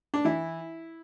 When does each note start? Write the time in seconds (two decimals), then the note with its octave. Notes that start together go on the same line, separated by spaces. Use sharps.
0.14 D4
0.25 E3 E4